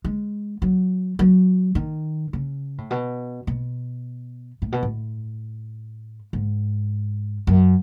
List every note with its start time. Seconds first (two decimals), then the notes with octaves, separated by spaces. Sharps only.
0.04 G#3
0.62 F#3
1.19 F#3
1.75 D#3
2.33 C#3
2.78 A2
2.91 B2
3.47 B2
4.62 A2
4.72 B2
4.83 A2
6.33 G#2
7.47 F#2